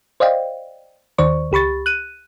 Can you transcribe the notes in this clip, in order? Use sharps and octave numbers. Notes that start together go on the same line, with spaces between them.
C5 D5 D#5 F5 G5
D#2 D#3 C5 D5 C#6
C#2 G4 B5 C#6 A6
F#6 D#7